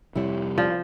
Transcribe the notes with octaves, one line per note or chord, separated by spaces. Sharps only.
F2 C3 G3 E4 C#5
F3 C#4 C5 D5